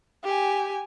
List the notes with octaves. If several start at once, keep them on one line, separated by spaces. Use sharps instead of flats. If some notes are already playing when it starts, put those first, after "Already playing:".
G4 G#5